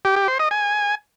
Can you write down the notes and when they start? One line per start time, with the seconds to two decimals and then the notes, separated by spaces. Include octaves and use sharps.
0.05 G4
0.16 G4
0.28 C5
0.39 D#5
0.51 G#5